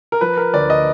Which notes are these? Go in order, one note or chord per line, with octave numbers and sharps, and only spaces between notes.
A#4
F3 B4
A#4
D2 D5
D#5